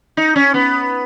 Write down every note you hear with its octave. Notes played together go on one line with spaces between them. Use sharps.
D#4
C#4
B3